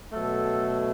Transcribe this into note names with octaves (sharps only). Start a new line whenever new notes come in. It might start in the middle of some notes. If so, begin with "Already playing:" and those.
B2 F#3 A3 A4